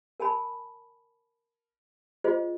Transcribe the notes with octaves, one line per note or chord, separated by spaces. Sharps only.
A#4 G#5 A5 B5
F4 G#4 C5 D#5